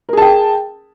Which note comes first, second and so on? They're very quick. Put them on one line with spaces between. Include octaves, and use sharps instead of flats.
A#4 G#4 A5 G5